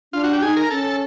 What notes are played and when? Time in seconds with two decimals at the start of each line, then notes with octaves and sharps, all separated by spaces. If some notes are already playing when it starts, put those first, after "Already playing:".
0.13 D4 F4
0.24 F#4
0.33 G4
0.42 D#4 G#4
0.56 A#4
0.71 C#4 A4